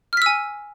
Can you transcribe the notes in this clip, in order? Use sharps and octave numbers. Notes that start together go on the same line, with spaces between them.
G#5 E6 F6 B6